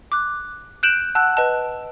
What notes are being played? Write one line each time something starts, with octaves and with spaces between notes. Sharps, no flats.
D6 F#6
F#6 G6 D7 E7 F#7
F#5 A5 E6 F#6
B4 D#5 A5